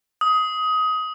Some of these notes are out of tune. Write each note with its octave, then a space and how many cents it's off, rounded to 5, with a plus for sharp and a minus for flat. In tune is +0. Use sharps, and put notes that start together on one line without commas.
D#6 +20